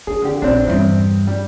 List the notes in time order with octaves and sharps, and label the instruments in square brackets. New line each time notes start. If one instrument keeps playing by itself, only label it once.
[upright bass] D4 [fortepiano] G#4
[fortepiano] D3 G4
[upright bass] A#1 [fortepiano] C4 D4
[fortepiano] E2 C4 [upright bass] G2 G3
[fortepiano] G3